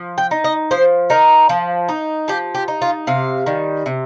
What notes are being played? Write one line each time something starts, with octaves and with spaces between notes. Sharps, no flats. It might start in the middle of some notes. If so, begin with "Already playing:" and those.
Already playing: F3
G5
D#4
D#5
F3 C5
D#4 A#4
F3
D#4
F3 G4
G4
D#4
F4
C3 F5
D#3 G3
C3